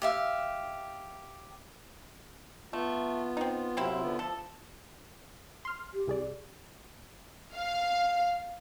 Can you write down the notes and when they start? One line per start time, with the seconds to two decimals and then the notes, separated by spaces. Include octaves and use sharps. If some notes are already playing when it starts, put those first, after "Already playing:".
0.02 G4 E5 F5
2.73 A3 B3 F4
3.37 C4 D#4
3.77 C3 F#3 A#3 C4 E4 C5
4.02 D3 B3 F4
4.19 F3 A4
5.65 C6 F6
5.94 G4
6.07 C2 G#4 D5
7.56 F5